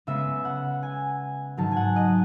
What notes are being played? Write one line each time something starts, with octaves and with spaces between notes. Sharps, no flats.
C#3 G#3 B3 E5
F#5
G#5
G#2 D#3 F#3 A5
F#5 G#5
D#5